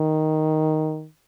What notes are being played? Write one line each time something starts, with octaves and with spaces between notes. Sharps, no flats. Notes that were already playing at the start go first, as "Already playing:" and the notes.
Already playing: D#3